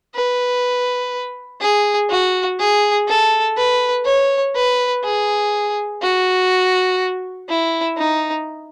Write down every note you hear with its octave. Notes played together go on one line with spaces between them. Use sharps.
B4
G#4
F#4
G#4
A4
B4
C#5
B4
G#4
F#4
E4
D#4